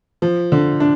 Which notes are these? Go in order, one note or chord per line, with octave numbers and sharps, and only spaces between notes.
F3
D3
D4